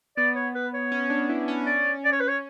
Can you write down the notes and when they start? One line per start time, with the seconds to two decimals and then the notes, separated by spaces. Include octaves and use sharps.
0.17 B3 D5
0.35 C#5
0.55 B4
0.74 C#5
0.92 C#4
1.10 D4
1.29 E4
1.48 C#4
1.66 C#4 D5
2.04 D5
2.12 C#5
2.20 B4
2.28 C#5